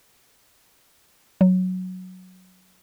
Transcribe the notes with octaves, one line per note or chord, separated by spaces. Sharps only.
F#3